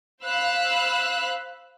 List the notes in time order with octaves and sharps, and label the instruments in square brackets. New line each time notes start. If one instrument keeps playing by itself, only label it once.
[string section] C5 F5 B5 E6 F#6